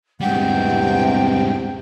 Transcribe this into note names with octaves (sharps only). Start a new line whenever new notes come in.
E2 G#2 C3 G3 F#5 G5